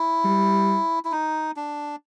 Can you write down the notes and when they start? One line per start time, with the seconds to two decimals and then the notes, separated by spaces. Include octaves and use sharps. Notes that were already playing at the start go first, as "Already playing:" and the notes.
Already playing: E4
0.25 G3
1.05 E4
1.12 D#4
1.57 D4